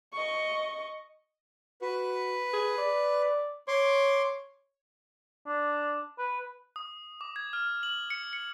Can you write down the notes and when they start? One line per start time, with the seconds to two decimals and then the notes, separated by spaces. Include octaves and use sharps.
0.13 D#5 C#6
1.82 F#4 B4
2.53 G#4
2.78 D5
3.68 C#5 C6 D6
5.47 D4
6.18 B4
6.76 D#6
7.21 D6
7.36 G#6
7.53 F6
7.83 F#7
8.10 C#7
8.33 C#7